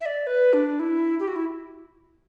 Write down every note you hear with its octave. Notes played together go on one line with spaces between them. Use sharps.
E5
D5
B4
D4
E4
G4
F#4
E4